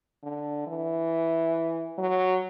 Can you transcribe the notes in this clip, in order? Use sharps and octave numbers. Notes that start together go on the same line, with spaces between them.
D3
E3
F#3